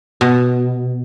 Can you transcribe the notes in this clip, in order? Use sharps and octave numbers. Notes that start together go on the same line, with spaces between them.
B2